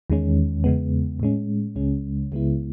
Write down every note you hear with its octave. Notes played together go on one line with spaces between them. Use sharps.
E2 D#3 G#3 C#4
E2 C#3 G#3 B3
A2 G#3 C#4
C#2 C#3 G#3 C#4
C#2 C#3 G#3 B3 E4